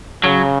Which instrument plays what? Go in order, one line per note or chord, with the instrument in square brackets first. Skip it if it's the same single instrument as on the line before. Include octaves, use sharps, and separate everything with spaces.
[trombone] C#3 [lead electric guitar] F#3